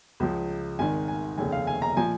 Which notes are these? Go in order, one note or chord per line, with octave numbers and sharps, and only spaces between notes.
C#2 C#3 F3
G#1 G#2 D#3 G#5
G#5
F1 D#2 C#3 G#5
F5
G#5
A#5
A#2 F3 G#5